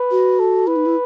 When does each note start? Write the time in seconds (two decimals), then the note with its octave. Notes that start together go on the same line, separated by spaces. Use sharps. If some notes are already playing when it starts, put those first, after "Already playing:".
Already playing: B4
0.11 F#4
0.39 A4
0.67 E4 B4
0.76 D#4
0.86 E4